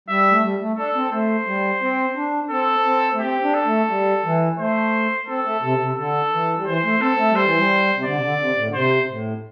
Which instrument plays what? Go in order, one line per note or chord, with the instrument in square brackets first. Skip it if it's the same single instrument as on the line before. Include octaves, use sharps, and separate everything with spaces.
[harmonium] G3 [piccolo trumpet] E5
[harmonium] A3
G3
A3
[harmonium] D4 [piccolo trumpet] A4
[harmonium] C4
[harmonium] A3 [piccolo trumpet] C5
[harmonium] G3
C4
D4
[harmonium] C4 [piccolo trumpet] A4
[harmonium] C4
A3
[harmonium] C4 [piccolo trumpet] G4
[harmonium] D4
[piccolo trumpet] A4
[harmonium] A3
G3
E3
[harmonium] A3 [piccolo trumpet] C5
[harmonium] C4 [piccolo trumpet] A4
[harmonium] A3
C3
C3
[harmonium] D3 [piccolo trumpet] A4
[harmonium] E3
G3
[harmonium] E3 [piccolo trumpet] C5
[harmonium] A3
[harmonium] C4 [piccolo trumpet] A4
[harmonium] A3
[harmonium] G3 [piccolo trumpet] C5
[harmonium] E3
G3
C3
[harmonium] D3 [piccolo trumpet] D5
[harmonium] C3
D3
C3
A2
D3
[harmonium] C3 [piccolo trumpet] C5
[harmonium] A2